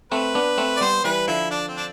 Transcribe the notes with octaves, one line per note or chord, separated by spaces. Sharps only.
A3 C4 B4
B3 D4
A3 C4
D5
G3 B3 C5
E3 G3 B4
D3 F3 E4
D4
C4
D4